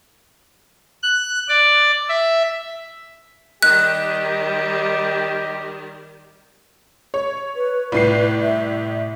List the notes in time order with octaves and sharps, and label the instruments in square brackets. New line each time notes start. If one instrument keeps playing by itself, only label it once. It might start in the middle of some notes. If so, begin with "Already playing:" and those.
[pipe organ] F#6
D5
E5
[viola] D#3 G3 [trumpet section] G4 [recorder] D#5 [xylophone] F#6
[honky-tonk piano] C#5
[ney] B4
[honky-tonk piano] C2 A2 C7 [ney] B4
[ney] E5